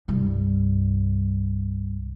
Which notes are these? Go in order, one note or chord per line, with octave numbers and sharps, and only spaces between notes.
C2 G2